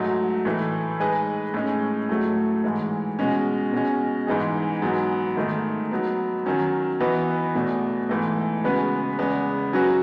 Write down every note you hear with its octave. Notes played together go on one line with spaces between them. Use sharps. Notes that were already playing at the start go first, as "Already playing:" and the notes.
Already playing: G#2 F#3 A3 D#4
A2 E3 A3
G#3 D#4 G#4 B4 D#5
A2 G#3 C#4
A2 F#3 A3
G#2 E3 G#3
B2 G#3 C#4
B2 G#3 C#4
G#2 E3 G#3 D#4 G#4
G#2 F#3 B3
G#2 D#3 A3 D#4
F#3 B3 D#4
D#3 F#3 C#4
E3 B3 F#4 B4 D#5
E2 B2 A3
G#2 E3 A3
C#3 G#3 B3 F#4 B4
E2 C#3 G#3 B3
F#3 C#4 F#4 B4